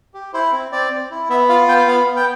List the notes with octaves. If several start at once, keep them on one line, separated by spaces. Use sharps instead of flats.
G4
E4 C5
C4
C4 D5
C4
E4
B3 E5
F4 F5
B3 G5
B3 F5
B3
G5